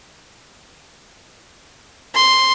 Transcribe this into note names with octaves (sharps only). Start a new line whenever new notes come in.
C6